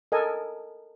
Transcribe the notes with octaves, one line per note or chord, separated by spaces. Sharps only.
A4 A#4 D#5 G#5